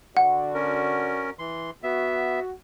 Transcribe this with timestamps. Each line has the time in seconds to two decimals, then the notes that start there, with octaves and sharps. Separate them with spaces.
0.17 D3 F#4 D5 F#5
0.54 C#4 A#4
1.39 E3 C6
1.83 B3 F#4 E5